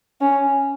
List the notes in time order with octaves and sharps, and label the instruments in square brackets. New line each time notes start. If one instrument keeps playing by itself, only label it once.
[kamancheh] C#4